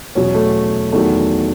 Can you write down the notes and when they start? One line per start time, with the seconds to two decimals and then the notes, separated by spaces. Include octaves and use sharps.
0.15 E2 B2 F#3 C#4
0.35 A3
0.92 E2 D#3 F#3 A3